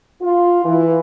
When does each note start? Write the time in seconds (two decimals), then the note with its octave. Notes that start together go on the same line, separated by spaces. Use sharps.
0.21 F4
0.64 E3